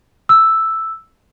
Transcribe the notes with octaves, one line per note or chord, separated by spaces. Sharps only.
E6